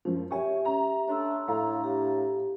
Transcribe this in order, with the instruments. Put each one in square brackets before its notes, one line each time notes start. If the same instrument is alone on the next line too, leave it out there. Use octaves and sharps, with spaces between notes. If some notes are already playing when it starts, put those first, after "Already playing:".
[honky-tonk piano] F#2 F3 [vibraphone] C#4
[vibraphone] G4 E5 [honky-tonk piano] C#5 G#5 C#6
[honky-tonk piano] C#4 A#5
[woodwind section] A3 D4 [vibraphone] C#5 C6 E6
[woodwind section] A2 D4 [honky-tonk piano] F5 A#5
[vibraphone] G4